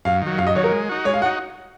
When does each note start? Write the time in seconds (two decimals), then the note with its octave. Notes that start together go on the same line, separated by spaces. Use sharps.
0.05 F#2 F5
0.22 D#3 F#3
0.38 F#2 F5
0.47 D#5
0.55 D#3 F#3 C#5
0.64 A#4
0.72 G#3
0.89 D#4 F#4
1.05 G#3 C#5
1.14 F5
1.22 F#4 F#5
1.25 D#4